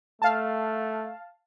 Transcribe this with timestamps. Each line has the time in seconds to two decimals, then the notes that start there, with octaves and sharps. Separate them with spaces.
0.22 A3 F5 A5